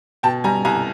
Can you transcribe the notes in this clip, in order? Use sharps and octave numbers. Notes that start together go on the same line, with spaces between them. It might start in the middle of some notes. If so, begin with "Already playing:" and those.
B2 G5 A5
G3 G#5 A#5
C2 G#5 A#5